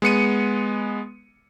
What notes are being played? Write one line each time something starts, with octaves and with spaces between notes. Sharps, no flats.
G#3 B3 C#7 D#7